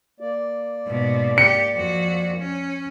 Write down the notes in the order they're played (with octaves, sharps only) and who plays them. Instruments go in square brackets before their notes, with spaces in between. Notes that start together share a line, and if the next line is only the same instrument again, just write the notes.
[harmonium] A#3 D5
[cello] G#2 B2
[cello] G4 [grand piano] C#7
[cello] F2 F#4
C#4